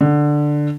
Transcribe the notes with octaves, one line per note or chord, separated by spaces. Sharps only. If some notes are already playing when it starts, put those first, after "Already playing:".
D3